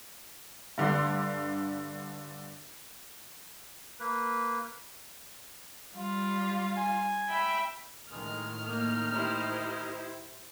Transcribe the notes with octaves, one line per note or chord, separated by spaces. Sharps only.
G2 D3 D4 C6
A#3 B4
G3 F4
G#5
E5 G5 B5
A2 D#3 G#3 F6
A#3 D#4
E4 G4 C5